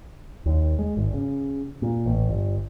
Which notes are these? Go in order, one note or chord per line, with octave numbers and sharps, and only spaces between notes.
D#2
G#3
G#1
C#3
A#2
A1
G1